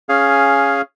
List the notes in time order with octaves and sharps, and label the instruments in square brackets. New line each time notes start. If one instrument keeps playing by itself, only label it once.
[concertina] C#4 G#4 F5